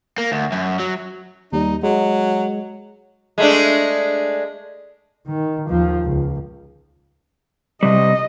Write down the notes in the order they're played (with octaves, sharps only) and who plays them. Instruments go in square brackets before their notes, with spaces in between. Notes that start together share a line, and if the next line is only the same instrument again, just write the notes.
[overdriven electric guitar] A#3
D2
F#2
F#3
[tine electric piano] D#2 G3 [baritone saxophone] D#4
[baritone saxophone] F#3 [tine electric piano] G#3
[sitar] G#3 A3 D4
[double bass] D#3
D#2 F3
C#2
[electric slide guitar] C3 G3 [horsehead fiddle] D#5